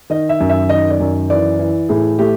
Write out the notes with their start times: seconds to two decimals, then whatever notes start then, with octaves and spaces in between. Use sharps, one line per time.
0.10 D#3 D#5
0.29 E5
0.40 F#2
0.49 E5
0.69 D#3 D#5
0.90 D5
1.00 F#2
1.30 E3 D5
1.59 E3
1.89 A2 G#4
2.19 A3 G4